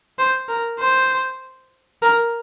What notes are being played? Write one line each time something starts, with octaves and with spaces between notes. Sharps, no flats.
C5
A#4
C5
A#4